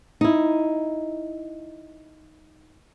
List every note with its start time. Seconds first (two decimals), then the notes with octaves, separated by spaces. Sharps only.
0.21 D#4 E4